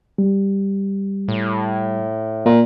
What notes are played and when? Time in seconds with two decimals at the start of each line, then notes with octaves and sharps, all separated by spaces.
0.18 G3
1.28 A2
2.46 A#2